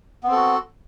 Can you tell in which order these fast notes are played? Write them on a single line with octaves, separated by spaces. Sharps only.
B3 C4 A4 F#4